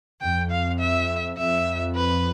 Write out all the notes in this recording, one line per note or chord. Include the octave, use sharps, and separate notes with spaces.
F2 G5
F5
E5
F2 E5
B4